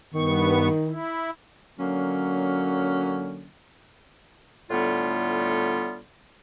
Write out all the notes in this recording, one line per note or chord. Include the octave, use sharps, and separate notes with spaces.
G2 D#3 B3 C#6
E4
D3 F#3 A#3 C#4
A2 D3 G3 B3 F4